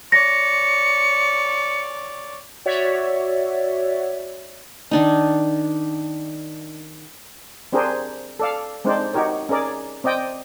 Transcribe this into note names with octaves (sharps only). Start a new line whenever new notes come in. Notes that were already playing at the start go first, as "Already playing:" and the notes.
C#5 D5 A#6 C#7
F#4 C#5 D5 E5
D#3 D4 D#4
C4 D4 G4 G#4 A#4 C5
A4 D5 F5
G#3 C4 D4 D#4 C5 D5
D#4 F#4 G4 A#4 C#5
C#4 G#4 A#4 D5
C4 D5 D#5 G5